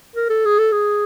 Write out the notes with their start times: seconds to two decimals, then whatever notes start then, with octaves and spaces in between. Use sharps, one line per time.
0.16 A#4
0.30 A4
0.45 G#4
0.58 A4
0.72 G#4